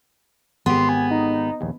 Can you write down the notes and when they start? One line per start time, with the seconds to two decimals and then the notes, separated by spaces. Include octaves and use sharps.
0.66 G#1 B3 G4 C6
0.89 G#5
1.11 D#4
1.61 A#1 D#2